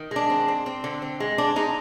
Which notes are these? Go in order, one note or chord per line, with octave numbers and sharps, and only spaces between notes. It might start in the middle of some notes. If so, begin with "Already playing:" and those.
Already playing: D#3
G#3 D4
C4
C4
C4
D3
C4
G#3
C4 D4
G#3 D#4